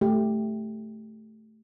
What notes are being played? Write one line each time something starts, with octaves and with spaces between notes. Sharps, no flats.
A3 G4